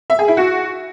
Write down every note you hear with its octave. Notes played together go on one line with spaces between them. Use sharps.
E5
G#4
E4
F#4